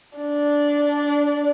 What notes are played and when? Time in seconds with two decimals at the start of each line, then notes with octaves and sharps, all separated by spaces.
0.18 D4